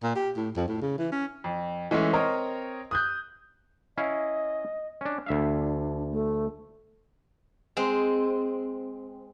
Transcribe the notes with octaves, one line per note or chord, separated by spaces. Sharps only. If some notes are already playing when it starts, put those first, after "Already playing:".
A#2
G4
A2
F2
A2
C#3
E3
C#4
F2
E3 G#3 A3 C#4 E4
C4 A#4 C#5 D#5 A#5
D#6 F#6 G6
C#4 E4 D#5 F5
C#4 D4
D2 D4 E5 F5
A3
G#3 C4